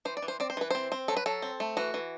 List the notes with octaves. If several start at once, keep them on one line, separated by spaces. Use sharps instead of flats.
E3 C5
D5
E3
C5
C4 D5
C5
E3 B4
C4 C5
C4
F#3 A4
B4
F#3 A4
C4
A3
E3 F#4
E3